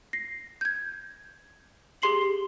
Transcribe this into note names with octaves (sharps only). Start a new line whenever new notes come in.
A#6 C7
G6 G#6
G4 G#4 C6 C7 F#7